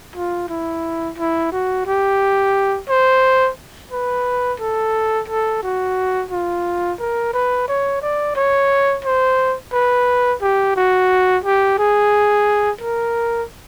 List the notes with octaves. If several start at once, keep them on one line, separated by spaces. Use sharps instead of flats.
F4
E4
E4
F#4
G4
C5
B4
A4
A4
F#4
F4
A#4
B4
C#5
D5
C#5
C5
B4
G4
F#4
G4
G#4
A#4